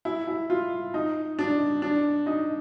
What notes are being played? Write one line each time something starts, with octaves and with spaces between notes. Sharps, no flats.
E4
E4
F4
D#4
D4
D4
D#4